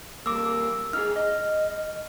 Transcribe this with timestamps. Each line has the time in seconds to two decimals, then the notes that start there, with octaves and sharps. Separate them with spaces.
0.26 G3 A#3 D6 E6
0.93 D#4 E4 G#4 F6
1.16 D#5